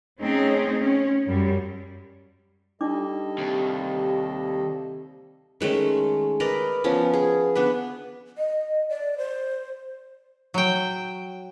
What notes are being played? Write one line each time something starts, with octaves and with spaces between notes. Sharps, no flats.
A3 C4 C#4 D#4 G#4
C#4
F#2 G3
G3 D4 D#4 A4 D#5 D6
D#2 C3
D#3 G#3 A3 C#4
A#4 B4 D5 D#5
F3 B3 C#4
G#4
B3 D4 B4
D#5
D5
C5
F#3 G5